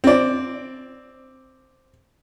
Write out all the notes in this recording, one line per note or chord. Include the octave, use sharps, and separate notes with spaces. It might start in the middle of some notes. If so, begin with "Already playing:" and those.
C4 D5